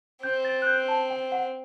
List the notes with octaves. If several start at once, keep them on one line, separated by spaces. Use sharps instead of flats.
C4 G6
A6
F#6
G6
A5
G5
F#5